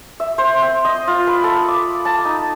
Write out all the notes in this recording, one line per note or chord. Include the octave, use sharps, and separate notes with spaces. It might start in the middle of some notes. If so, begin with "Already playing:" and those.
E5
C5
C4
D#5
F4
B4
A4
D6
A5
D#4